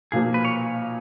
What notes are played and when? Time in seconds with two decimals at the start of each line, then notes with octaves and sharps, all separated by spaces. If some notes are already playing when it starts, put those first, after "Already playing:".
0.12 B1 A#2 F3 A#3 G#4
0.34 B4
0.45 C#5